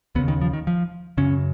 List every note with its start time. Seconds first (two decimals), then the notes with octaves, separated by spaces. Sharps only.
0.15 D#2 C#3 B3
0.28 D#3
0.41 F3
0.53 D#3
0.67 F3
1.18 F#2 C#3 C#4